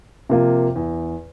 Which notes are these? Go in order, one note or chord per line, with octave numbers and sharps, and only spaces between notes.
C3 F3 A#3 F4
E2